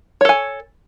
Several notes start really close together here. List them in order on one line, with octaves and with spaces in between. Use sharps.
C#5 A4 G#5